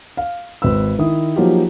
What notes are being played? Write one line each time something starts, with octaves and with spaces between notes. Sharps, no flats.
F5
G#1 B4 E6
D#3 E4 D#6
F3 F#3 A#3 D#4 F4 G4